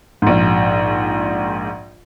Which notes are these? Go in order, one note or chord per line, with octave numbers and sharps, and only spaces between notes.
A#1 G#2